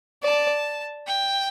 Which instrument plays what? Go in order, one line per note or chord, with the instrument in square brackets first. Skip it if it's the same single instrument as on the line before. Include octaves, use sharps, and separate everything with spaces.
[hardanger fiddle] D5 [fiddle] A5
[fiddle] G5